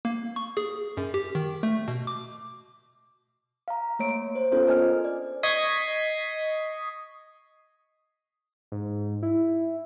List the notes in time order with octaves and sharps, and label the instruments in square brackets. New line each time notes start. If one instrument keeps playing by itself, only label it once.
[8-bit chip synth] A#3
C#6
G#4
F#2
G4
D#3
A3
B2
D6
[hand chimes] F5 A#5
A3 A#3 C#5 D7
C5
B3 C#4 D4 F4 A4 C5
A4 A#4 D#5 G#5 F6
D5
[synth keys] D#5 C#6 D#6 G#6 B6 C7
[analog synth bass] G#2
E4